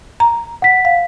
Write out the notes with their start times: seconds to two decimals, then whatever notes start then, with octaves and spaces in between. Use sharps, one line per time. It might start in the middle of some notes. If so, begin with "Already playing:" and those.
0.20 A#5
0.62 F#5 B6
0.85 F5